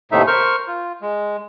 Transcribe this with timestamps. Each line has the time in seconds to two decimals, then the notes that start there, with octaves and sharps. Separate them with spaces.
0.12 D#2 A2 C3 A3 D#4 E5
0.27 A#4 C5 C#6 F6
0.68 F4
1.02 G#3